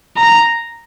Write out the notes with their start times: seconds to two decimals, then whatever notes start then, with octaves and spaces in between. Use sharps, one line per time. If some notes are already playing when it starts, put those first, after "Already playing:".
0.17 A#5